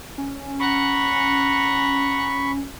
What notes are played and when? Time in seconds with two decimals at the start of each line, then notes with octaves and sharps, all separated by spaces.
0.18 C#4
0.60 F#5 A#5 B5 C#6